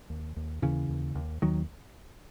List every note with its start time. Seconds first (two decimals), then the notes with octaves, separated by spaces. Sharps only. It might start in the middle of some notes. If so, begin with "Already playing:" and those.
0.10 D#2
0.36 D#2
0.62 D#2 C#3 E3
0.89 D#2
1.15 D#2
1.42 D#2 D#3 F#3